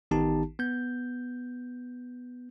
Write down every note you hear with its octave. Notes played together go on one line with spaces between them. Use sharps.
A1 D#3 B3 D#4 G4 A5
B3 G6